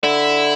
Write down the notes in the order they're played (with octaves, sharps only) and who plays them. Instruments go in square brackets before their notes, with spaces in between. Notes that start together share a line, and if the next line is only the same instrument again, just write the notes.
[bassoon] D3 [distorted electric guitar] E4